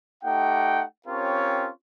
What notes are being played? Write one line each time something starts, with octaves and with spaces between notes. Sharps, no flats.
A3 D#4 G4 F#5 G5
C4 C#4 F4 G4 A#4 C#5